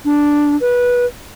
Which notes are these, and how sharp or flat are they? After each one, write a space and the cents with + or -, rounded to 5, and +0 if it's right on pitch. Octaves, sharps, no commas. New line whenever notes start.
D4 +0
B4 -20